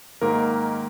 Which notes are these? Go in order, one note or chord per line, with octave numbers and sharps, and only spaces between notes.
G#2 D#3 A#3 A#4